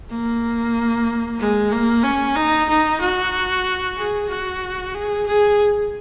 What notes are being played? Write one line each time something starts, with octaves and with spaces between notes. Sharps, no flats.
A#3
G#3
A#3
C#4
D#4
D#4
F#4
G#4
F#4
G#4
G#4